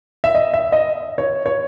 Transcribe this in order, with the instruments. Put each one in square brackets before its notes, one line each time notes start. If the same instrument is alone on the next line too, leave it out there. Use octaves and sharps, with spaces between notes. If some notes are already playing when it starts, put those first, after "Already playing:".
[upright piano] E5
D#5
E5
D#5
C#5
C#5